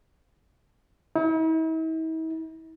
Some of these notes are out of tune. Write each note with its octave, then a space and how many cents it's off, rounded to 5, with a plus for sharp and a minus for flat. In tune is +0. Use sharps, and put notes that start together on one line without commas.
E4 -45